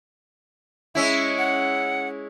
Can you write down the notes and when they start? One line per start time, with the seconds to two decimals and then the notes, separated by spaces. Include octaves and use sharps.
0.95 G#3 C#4 E4 E5
1.38 F#5